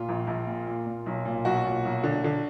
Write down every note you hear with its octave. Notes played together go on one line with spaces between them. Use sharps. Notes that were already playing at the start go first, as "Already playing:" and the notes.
Already playing: A#2 F4
A#1
A#1
A#2
A#2
A#2
B1
A#2
B1 F#4
A#2
B1
D3
D3